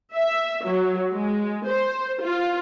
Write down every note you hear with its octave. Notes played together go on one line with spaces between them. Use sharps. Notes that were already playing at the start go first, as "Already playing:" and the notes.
E5
F#3
G#3
C5
F4